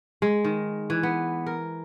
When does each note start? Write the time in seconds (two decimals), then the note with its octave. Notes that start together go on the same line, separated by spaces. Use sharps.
0.22 G#3
0.44 D#3
0.90 E3
1.03 B3
1.46 A#4